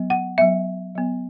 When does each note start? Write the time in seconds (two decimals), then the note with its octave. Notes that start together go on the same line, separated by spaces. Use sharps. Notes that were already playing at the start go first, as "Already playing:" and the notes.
Already playing: F#3 B3
0.10 F#5
0.38 F#3 B3 E5
0.95 F#3 B3